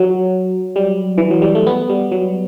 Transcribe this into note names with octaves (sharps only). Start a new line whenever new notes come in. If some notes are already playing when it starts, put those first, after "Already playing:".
Already playing: F#3
G3
E3
F#3
G3
A3
B3
G3
F#3